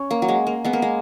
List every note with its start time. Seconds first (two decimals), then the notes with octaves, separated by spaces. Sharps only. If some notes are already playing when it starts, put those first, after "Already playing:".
Already playing: C#4
0.11 A#3
0.22 F#3
0.28 G#3
0.47 A#3
0.64 G#3 B3
0.73 A#3
0.82 G#3